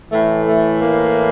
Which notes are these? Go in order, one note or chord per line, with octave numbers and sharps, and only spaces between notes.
A2 E3 A3
A3
A#3